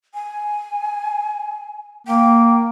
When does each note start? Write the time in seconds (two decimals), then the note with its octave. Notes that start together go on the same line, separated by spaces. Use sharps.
0.14 G#5
2.07 A#3 G5